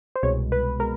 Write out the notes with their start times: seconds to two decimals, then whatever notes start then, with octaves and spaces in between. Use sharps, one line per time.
0.16 C5
0.23 C2 B2 G#3 C#5
0.52 B4
0.79 B2 G#3 A#4